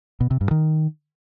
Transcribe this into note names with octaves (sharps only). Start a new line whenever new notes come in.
B2
C3
G2
D#3